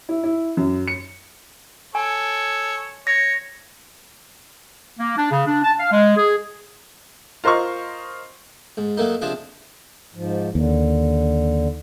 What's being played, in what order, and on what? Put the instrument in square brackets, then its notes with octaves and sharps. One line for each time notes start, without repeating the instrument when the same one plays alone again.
[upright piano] E4
E4
F#2
C#7
[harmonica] A4 C#5 [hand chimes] G#5
[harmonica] C#5 [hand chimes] A#6
[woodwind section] A#3
D4
C#3
D4
A5
F5
G#3
G#4
[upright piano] F4 A#4 C5 D#5 C#6
[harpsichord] G#2
F#3 A3 A#3 D#4
C3 F3 D4 G#4
[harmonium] G#2 F3
[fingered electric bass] D#2 [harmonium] D3